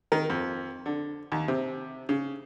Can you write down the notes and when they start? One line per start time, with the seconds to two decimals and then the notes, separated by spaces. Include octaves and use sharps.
0.12 D#3
0.30 F2
0.86 D3
1.32 D#2
1.48 C3
2.09 C#3